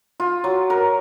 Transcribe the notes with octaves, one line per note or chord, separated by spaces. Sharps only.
F4
F#3
A#4